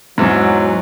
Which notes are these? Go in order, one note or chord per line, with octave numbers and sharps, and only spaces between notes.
E2 G#2 F#3